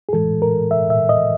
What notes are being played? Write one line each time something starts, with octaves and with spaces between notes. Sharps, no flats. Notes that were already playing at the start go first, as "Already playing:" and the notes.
G#4
A2 E3 G#3 A4
A#4
E5
E5
D#5